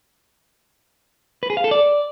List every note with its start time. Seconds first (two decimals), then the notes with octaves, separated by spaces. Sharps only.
1.43 B4
1.50 G#4
1.57 F5
1.64 A4
1.71 D5